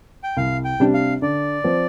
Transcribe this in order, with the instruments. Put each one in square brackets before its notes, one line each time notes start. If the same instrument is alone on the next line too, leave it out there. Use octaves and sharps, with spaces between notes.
[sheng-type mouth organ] G5
[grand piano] C2 [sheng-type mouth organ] F5
[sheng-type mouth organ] G5
[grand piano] C3 G3 D4
[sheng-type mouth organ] F5
[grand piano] D3 [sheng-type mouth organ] D5
[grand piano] F3 C4